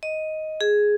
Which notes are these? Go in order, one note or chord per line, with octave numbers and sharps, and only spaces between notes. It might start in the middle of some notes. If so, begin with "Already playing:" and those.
D#5
G#4